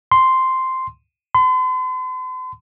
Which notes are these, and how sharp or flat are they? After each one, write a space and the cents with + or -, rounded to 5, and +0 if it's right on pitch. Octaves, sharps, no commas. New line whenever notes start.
C6 -5
C6 -45